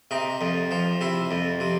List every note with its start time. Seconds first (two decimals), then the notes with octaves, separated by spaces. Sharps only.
0.11 C3 D#4
0.41 F2
0.71 F3
1.01 C3 E4
1.31 F2
1.60 C3